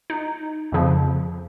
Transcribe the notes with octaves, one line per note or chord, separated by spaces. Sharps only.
D#4
F2 C#3 F3